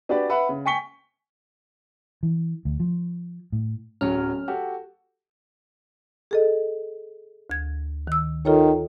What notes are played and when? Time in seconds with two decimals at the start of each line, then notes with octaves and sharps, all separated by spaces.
0.09 D4 F#4 G4 B4 D5
0.29 B4 E5 F#5 B5
0.49 C#3
0.65 G5 G#5 C#6 B6 C#7 G7
2.23 E3
2.65 D2
2.80 F3
3.52 A2
4.01 D1 F#3 C#4 F6
4.48 F#4 G4 A4
6.31 G#4 A4 D#5
7.50 D2 G#6
8.07 D#3 E6
8.45 D#3 F4 A4 C#5